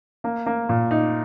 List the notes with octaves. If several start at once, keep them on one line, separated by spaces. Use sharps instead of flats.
A#3
A#3
A#2
D#4